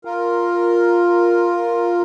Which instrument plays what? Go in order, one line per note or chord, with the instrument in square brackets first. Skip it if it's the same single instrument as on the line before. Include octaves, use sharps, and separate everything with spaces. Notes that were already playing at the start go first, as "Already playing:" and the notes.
[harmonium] F4 A#4